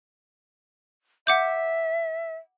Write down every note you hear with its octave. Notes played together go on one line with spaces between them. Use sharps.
E5 F#5 D6 G6